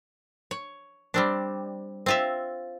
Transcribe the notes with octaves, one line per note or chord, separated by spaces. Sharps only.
C#5
G3 C4 D4
C4 F4 E5